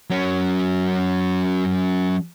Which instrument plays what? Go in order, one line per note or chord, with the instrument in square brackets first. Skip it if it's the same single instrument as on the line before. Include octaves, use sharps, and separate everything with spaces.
[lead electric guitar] F#3 C#4